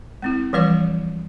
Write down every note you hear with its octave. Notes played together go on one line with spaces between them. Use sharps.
G#3 C4 E4
E3 F3 G3 B4 C#5 D6